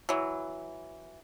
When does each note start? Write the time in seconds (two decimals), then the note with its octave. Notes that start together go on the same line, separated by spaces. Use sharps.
0.09 E3 F#3